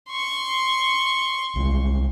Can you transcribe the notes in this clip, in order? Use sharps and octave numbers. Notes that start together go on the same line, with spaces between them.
C6 C#6
C2 G#3